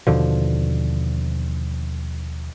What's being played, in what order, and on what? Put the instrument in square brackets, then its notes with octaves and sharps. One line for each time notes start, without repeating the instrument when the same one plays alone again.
[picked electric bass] D#2 B2 D3 F3